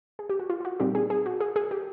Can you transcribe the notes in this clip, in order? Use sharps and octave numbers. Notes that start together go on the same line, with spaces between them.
G#4
G4
F#4
F4
F4
F#4
A#2 G3 C4 D#4 G4
G#4
G#4
F#4
G#4
G#4
G4